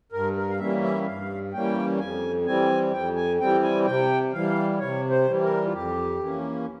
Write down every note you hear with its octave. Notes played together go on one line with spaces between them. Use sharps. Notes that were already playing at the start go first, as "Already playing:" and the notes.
G2 A#4
A#4
F5
E3 G3 A#3 C#4 E5
E5
G2 F5
E3 G3 A#3 C#4 G5
F2 G#5
E3 G3 C4 G#5
F2 G5
G#5
E3 G3 C4 G5
G#5
C3 G5
E3 G3 F5
C3 C#5
C5
E3 G3
A#4
F4
F2 G4
E3 A#3 C#4